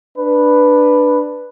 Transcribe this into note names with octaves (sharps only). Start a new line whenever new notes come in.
D4 B4